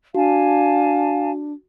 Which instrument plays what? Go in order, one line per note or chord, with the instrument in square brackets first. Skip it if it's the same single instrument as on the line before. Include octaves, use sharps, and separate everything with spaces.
[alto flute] D4 [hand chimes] F#4 [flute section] F5 G#5 A5